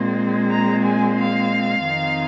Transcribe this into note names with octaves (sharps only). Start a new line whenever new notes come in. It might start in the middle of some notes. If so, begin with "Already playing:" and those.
Already playing: A#2 G#3 C4
A#5
G#5
F5
F2 D#3 C4 D#4